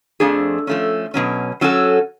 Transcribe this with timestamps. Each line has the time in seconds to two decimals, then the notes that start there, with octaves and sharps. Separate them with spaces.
0.20 F2 F3 A3 D4 G#4
0.67 F3 A3 C#4
1.14 B2 F#3 C#4
1.61 F#3 C#4 F#4 A4